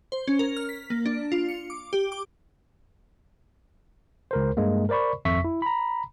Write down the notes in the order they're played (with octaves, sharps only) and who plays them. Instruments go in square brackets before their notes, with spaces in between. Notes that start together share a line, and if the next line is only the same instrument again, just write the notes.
[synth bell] C5
C#4
A#4
F6
B6
A#3
D4
F4
C#7
D6
G4
D6
[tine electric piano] C#2 A#4 C5
G2 G#3 A#3
A#4 C5 D5 B5 C#6
G#1 F2 E5 C#6 B6
E4
A#5 B5